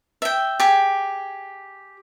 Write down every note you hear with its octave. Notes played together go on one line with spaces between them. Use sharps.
E5 G5
G4 G#4